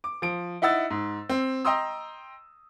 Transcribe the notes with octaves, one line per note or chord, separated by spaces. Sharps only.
D6
F3 D7
D#4 E4 F#5 E6 A6
G#2
C4
D#5 G5 A#5 C6 D#6 E6